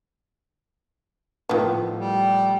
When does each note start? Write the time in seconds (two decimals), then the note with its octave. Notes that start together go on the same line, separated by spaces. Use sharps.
1.49 A2 D#3 F3 B3
1.97 G3